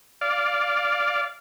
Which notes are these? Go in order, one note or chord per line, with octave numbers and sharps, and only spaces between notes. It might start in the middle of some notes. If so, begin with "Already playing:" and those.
D5 F5